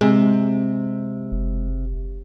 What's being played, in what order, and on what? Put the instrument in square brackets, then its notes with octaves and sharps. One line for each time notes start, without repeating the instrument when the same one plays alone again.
[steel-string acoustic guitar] C3 [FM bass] G#3
[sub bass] F#1